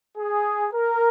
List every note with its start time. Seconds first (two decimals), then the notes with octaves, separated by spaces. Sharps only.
0.18 G#4
0.73 A#4